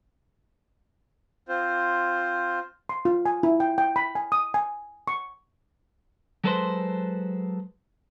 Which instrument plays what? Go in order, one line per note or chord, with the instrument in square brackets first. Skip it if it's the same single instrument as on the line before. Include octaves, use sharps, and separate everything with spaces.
[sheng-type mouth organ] C4 F4 C5
[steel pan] C6
F4
G#5
E4
G5
G5
B5
G#5
D#6
G#5
C#6
[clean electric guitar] F#3 G#3 A4 B4 C5 C6